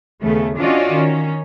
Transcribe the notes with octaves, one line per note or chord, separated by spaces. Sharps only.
D#2 C#3 A3 B3
C#4 D4 F4 F#4 D5 D#5
D#3 C#4